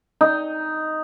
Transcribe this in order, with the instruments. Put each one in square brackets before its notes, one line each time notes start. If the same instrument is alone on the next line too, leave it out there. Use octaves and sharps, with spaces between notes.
[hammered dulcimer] D#4